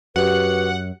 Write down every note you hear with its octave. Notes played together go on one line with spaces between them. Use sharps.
F#2 F#4 G4 B4 F#5